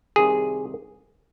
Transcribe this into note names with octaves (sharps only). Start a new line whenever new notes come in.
C2 C3 D#3 G#4